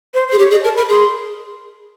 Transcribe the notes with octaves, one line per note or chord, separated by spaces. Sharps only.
C5
G#4 C5
G4 C#5
G#4 D#5
A#4 A5
A#4 B5
G#4 C6